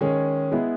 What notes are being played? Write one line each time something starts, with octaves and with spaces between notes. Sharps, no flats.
D#3 G#3 C#4 G#4
G#3 B3 E4 G#4